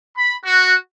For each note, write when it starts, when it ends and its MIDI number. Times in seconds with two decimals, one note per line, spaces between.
0.16 0.34 83
0.45 0.74 66